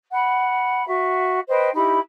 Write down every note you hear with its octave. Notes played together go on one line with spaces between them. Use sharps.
F#5 B5
F#4 E5
B4 C5 D#5 G5
D#4 E4 G4 B5